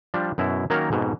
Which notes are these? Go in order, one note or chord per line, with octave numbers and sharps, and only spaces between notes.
F3 G3 D4
F#2 B2 E4
D#3 F#3 A#3 C#4 A#4 C#5
F2 G#2 B2